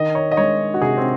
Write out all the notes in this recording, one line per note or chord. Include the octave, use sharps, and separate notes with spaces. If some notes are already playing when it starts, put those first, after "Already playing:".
Already playing: D#3 D#5
C#5
D#5
G#3 C#5
F#4
C3 G#4
C4